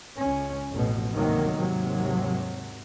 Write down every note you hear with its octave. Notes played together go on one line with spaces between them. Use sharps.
C#2 C#4
A1 F2 B2
D2 G#2 C3 D#3 F#3 A#3
D#2 G#2 C3 F#3